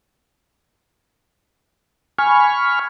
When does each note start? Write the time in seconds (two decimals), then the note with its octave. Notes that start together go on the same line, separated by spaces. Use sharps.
2.19 G#5 B5 C#6 F6